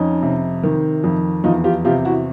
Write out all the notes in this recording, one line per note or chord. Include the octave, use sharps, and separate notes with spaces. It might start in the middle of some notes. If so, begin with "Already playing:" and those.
Already playing: F2 C#4 D#4
C3
D#3
F2
E2 D#4 F4
F4 G4
C3 F4 G4
E4 F#4